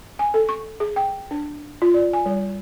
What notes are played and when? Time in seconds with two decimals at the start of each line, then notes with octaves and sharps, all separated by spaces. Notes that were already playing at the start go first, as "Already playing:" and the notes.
0.19 G#5
0.34 A4
0.49 C#6
0.80 G#4
0.96 G5
1.31 D4
1.82 F4
1.94 D5
2.13 G#5
2.26 G3